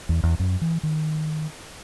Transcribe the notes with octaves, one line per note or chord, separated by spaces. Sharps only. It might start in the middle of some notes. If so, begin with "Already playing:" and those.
E2
E2
F#2
E3
D#3